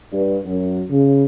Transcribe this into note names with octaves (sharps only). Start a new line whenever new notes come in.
G2
F#2
C#3